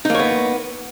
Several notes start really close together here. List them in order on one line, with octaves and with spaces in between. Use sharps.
D#4 A#3 C#5 B3